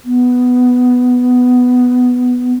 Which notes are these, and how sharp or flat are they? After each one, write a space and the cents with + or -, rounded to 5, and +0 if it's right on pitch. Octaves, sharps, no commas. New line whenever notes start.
B3 +5